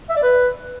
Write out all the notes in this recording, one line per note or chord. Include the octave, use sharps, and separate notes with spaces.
E5
D5
B4